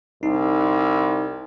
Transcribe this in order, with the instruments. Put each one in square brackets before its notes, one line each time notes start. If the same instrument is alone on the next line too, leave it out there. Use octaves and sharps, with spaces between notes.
[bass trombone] C2 [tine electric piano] D#4